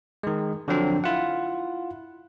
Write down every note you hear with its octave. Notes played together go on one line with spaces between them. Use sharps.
D#3 G#3
D3 F3 F#3 C4 D4
E4 F4 F#5